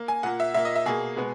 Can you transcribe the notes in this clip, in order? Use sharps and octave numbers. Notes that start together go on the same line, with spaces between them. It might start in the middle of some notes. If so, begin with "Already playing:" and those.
Already playing: A#3
G#5
A#2 A#3 F#5
E5
A#2 A#3 E5
D#5
E5
B2 A#3 G#4
B2 G#3 B3